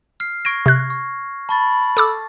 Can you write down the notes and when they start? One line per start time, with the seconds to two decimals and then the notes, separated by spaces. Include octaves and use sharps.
0.20 F6 C7
0.45 C#6 G#6 A#6 D7
0.66 C3 F#6
0.90 C#6
1.49 A5 B5 C#6 A6
1.97 A4 D6 E6